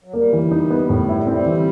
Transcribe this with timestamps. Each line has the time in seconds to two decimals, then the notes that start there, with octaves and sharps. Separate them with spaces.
0.04 F#3
0.13 G3 A#3
0.33 E3
0.51 D#4
0.70 B3
0.89 A2
1.09 E4
1.27 G3 C4
1.46 E3